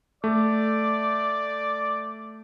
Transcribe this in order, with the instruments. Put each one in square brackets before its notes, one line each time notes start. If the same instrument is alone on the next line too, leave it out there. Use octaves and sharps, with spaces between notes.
[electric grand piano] A3 [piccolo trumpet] D5 [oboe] D6